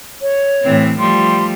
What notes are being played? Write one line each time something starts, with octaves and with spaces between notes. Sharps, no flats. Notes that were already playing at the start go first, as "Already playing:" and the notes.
C#5
A2 E3 C4
F3 G3 A3 C6